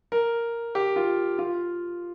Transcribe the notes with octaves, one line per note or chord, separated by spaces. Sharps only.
A#4
G4
F4
F4